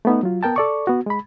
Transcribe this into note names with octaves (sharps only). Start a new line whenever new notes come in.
A3 B3 D#4
F#3 F4
B3 A#4 G5 A5
A4 D5 C#6
B3 F#4
G#3 B5